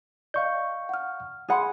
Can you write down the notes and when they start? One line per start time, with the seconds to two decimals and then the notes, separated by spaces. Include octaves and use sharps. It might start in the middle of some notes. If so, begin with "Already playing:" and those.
0.34 D5 D#5 F5 C#6 G6
0.89 F#5 F6
1.48 G#4 F#5 G#5 B5 C6